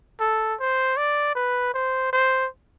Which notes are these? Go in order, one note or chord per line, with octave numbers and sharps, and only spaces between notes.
A4
C5
D5
B4
C5
C5